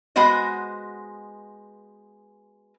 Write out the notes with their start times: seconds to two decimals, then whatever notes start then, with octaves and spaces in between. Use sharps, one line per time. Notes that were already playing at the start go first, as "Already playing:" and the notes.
0.16 G#3 B3 F#4 C5 D#5